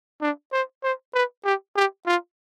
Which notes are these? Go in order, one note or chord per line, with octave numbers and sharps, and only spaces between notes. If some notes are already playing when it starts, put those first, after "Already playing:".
D4
C5
C5
B4
G4
G4
F4